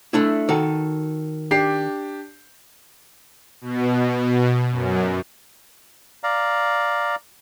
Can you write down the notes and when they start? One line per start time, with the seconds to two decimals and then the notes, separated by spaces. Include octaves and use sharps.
0.13 A3 D4 E4
0.49 D#3 F#4 A4
1.51 D4 G4 C7
3.61 B2
4.71 F#2
6.23 D5 F5 A#5